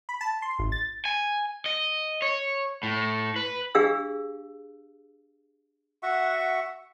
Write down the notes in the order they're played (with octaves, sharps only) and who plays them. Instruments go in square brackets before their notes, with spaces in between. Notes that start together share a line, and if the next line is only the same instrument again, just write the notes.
[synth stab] B5
A5
C6
G#1
A6
[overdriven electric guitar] G#5
D#5
C#5
A2
B4
[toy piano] D4 G4 G#4 F5 E6
[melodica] F#4 E5 F#5 C#6